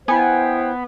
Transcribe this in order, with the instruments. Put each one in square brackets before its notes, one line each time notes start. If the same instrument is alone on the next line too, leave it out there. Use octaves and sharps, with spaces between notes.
[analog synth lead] B3 [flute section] E4 C5 G5 [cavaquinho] G#5